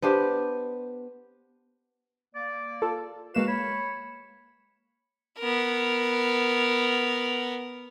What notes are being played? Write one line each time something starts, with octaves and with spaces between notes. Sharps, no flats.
B3 D4 G4 C5
A#3 D5
F4 A4
G#3 A#3 F#4 B4 F5 E7
C#5 B5
B3 A#4